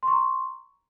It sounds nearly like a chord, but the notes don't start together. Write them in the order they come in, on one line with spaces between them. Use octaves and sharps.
C6 C#6 A#5